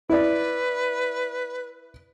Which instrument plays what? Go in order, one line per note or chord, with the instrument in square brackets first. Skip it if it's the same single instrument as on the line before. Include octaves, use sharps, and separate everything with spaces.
[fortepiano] E4 D5 [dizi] B4